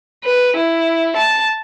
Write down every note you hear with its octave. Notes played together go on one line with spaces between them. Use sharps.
B4
E4
A5